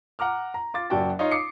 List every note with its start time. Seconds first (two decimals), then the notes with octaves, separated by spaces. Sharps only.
0.19 F#5 A#5 D6 F6
0.54 A#5
0.74 F4 D6 A6
0.90 F#1 F#2 F#4 D5 G5 A5
1.19 D#4 F4 C#5 D#5 F5
1.31 D6 D#6 C7 C#7